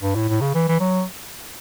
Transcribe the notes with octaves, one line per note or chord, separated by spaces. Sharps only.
G2
A2
A2
C#3
E3
E3
F#3